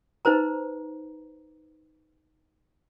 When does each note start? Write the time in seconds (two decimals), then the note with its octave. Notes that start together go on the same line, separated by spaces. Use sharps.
0.25 D#4 B4 C5 A#5